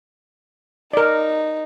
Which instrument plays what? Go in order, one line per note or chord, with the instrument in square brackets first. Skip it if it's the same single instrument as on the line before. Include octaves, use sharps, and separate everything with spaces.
[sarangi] D#4 [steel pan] A#4 D5